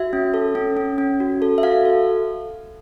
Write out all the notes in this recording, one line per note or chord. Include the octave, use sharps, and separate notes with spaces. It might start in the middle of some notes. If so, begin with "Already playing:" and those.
Already playing: F#4 E5
C#4
A4
C#4
C#4
C#4
F#4
A4
E5
F#4 F5
A4